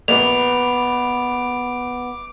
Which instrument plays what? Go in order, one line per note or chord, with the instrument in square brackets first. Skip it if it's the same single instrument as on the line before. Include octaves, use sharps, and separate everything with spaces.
[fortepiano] A#1 A#2 [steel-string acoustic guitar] B3 [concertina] D6 [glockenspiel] F7